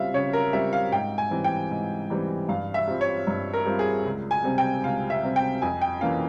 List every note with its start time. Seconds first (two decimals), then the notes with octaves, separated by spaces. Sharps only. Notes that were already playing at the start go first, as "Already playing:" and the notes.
Already playing: C#3 G3 C4 F4 E5 F5
0.14 C#3 C#5
0.33 A#4
0.53 G3 C4 F4 E5
0.73 F5
0.92 G#2 G5
1.18 G#5
1.31 E3 G3 C4
1.44 G5
1.71 G#2
2.10 E3 G3 C4
2.49 G2 F5
2.74 E5
2.88 G3 C4 F4
3.01 C#5
3.27 G2
3.53 A#4
3.66 G3 C4 F4
3.79 G#4
4.05 C#2
4.31 G#5
4.44 C3 G3 C4
4.58 G5
4.83 C#2 F5
5.10 E5
5.23 C3 G3 C4
5.36 G5
5.62 F2 G#5
5.82 G5
6.01 E3 A#3 C#4 F5